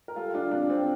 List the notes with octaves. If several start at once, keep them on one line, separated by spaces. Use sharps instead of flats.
A#4
G3 F4 A4
D4 F4
C3 D4
C4